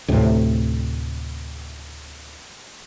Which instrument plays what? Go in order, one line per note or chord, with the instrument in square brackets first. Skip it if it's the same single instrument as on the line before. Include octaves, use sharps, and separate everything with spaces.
[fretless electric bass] D2 A2 C3